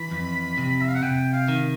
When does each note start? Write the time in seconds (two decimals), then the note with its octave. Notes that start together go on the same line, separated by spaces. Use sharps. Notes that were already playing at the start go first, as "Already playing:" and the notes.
Already playing: E3 B5
0.11 F2
0.58 C3
0.82 E5
0.89 F5
0.95 F#5
1.03 C3 G5
1.33 F5
1.48 D#3